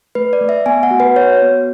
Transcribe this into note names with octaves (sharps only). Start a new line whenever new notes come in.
A3 B4
D5
A3
E5
B3 G#5
F#5
F#4
B4
F#4 C#5
B3